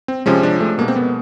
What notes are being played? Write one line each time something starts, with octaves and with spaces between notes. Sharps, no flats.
C4
C3 F3 G#3 C#4
D4
A3
B2 G#3 A#3
C4
B3